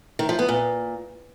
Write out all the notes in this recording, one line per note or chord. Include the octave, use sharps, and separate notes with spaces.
D#3
F3
B3
A#2